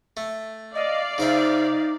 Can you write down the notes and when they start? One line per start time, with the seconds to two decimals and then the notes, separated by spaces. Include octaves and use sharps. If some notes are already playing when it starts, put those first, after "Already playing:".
0.17 A3
0.75 D5 D#5 F5
1.18 C#3 D#4 C5 E5